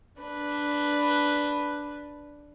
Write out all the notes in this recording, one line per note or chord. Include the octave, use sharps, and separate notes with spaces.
D4 B4